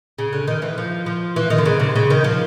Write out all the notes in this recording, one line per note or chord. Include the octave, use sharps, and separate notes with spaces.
C#3
D3
D#3
E3
F3
F3
E3
D#3
D3
C#3
C3
C#3
D#3
F3